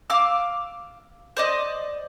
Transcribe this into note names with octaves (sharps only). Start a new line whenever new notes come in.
F5 D6 E6
C5 D5 D#5